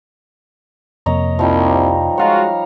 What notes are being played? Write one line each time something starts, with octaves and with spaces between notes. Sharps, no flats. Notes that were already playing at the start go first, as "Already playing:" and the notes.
F2 C3 A#3 C#5 D#5 A#5
C2 F3 G3 D#4
G#3 F4 F#4 C#5 F5 A#5